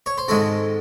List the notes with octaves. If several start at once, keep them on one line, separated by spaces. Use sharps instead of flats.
C#5
C5
G#2 D#3 G#3 C4 F#4 A4